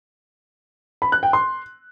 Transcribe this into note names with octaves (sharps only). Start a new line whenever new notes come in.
B5
F#6
G5
C6